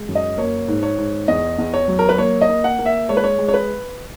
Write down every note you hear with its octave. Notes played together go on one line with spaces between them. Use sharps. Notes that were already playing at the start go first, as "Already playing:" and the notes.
Already playing: G#3
F#2
D#5
A#3 C#5
G#2
C#5
G#2
E2 D#5
E2
C#5
F#3
A#4
B4
A#3 C#5
D#5
A#3
F#5
A#3
E5
G#3 C#5
B4
C#5
G#3
C#5
B4